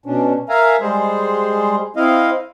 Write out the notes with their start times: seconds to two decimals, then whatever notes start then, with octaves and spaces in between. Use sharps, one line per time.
0.06 B2 C#4 D4
0.49 A#4 E5 F5 G#5 A#5
0.81 G3 G#3 G#4 C5
1.96 C4 E4 D#5 F5